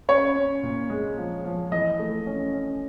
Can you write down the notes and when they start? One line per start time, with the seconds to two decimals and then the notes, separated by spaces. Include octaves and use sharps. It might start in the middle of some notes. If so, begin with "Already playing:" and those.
0.09 C#4 C#5
0.36 C#4
0.63 A#2
0.90 G#3
1.18 F3
1.45 F3
1.72 E3 D#5
1.99 A3
2.26 C#4
2.54 C#4